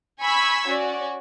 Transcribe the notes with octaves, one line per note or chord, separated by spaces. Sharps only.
G#5 B5 C#6 E6 G#6 B6
C#4 F#4 D5